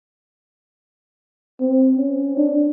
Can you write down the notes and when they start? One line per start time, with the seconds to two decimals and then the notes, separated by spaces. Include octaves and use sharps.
1.60 C4
1.97 C#4
2.37 D4